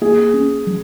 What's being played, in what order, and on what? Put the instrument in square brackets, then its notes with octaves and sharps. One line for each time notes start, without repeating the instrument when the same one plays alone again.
[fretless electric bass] A#3 [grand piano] G#4
[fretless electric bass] C#4
F#3